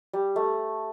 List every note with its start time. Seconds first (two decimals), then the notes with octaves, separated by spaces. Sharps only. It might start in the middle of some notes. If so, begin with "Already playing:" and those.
0.13 G3
0.36 A3